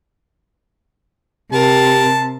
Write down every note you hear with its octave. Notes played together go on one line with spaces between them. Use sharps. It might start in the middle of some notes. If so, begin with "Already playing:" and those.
C3 G4 A#4 A5